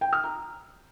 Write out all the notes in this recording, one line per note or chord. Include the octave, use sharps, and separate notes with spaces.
G5
F6
A#5